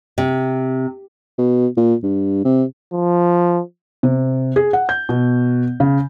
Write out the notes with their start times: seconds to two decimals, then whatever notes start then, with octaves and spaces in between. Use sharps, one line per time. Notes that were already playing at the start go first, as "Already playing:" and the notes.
0.18 C3
1.38 B2
1.77 A#2
2.03 G2
2.45 C3
2.93 F3
4.03 C3
4.56 G#4
4.73 F#5
4.89 G6
5.09 B2
5.80 C#3